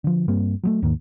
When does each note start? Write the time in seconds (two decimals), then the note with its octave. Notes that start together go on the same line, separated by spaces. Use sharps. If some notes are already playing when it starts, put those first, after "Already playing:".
0.04 D3 F3
0.28 G2 G3 A#3 C4
0.63 F#3 G#3 A3
0.82 D#2 G#2 D#3 A#3